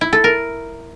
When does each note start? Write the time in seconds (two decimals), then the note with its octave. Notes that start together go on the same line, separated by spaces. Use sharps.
0.01 E4
0.13 A4
0.24 A#4